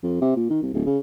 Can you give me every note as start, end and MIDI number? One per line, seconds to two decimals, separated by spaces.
0.03 0.16 41
0.21 0.35 48
0.36 0.47 46
0.50 0.61 51
0.62 0.72 36
0.74 0.81 26
0.86 0.98 49